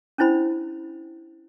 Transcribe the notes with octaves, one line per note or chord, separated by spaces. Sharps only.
C#4 D4 E4 C5 B5